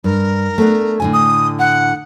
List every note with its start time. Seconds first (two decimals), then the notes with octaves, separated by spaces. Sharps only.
0.04 G2 A#4
0.58 A3 B3 D4
1.00 A2 D3 G#5
1.13 D#6
1.59 F#5